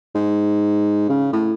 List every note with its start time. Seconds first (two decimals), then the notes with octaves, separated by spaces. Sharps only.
0.15 G#2
1.09 C#3
1.33 A2